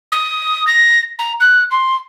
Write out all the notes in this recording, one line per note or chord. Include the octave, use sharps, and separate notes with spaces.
D#6
A#6
A#5
F#6
C6